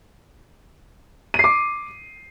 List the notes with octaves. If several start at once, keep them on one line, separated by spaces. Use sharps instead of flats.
D6 C7 D#7